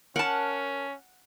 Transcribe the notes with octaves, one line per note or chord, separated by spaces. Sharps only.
C#4 A#4 F#5 A5